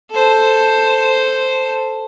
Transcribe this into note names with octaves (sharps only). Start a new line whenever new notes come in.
A4 C5